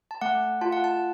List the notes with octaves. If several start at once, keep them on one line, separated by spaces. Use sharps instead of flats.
A5
A3 F#5
F4 A5
F#5
A5